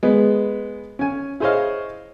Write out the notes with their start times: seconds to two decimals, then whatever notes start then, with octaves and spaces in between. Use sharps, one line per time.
0.03 G#3 B3 B4
0.99 C#4 G#5
1.40 E4 G#4 C5 C#5 D#5 F5